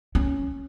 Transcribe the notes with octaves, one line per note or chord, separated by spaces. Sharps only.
C#4